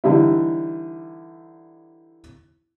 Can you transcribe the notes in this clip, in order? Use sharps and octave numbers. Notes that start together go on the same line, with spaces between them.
D3 E3 G3 D#4 E4